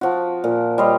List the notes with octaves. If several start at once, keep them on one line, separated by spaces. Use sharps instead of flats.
F3 F#4
A#2
G3 C#5 D#5 C6